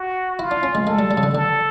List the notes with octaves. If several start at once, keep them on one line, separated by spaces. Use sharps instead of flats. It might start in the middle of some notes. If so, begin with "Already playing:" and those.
Already playing: F#4
E4 F4
D4
C#4
G#3
G#3 A4
G3
G3
C#3
D3
D3 A4